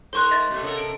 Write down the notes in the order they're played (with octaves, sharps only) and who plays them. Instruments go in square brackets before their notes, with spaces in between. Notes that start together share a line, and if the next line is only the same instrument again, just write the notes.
[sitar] G#2 A#4 C5 [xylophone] C6 C#6 F#6
[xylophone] D#5 E5 A6
[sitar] B2 A3
C3 A4 A#4
[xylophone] D7